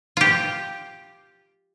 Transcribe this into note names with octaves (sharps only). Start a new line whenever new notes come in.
F4 G4